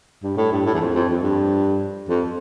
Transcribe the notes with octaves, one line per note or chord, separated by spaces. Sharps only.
G2
A2
G2
A2
E2
F2
F2
F2
G2
F2